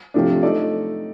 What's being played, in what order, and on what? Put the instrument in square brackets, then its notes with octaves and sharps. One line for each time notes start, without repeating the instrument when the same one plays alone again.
[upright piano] C3 F3 A3 D4
A3 D#4 A4 D5